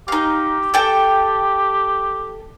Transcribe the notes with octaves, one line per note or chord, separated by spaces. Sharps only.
D#4 G4 F5
A4 G5 A5